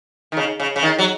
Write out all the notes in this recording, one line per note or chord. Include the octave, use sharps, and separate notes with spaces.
D#3
C#3
C#3
C#3
D#3
F#3